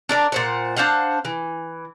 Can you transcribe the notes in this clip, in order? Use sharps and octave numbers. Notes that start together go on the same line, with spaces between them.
D4 A#4 D5
A#2 C5 F#5
D4 C5 F5 F#5
E3